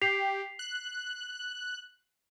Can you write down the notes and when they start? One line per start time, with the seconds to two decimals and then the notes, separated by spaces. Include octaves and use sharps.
0.01 G4 B6 C7 F7
0.59 F#6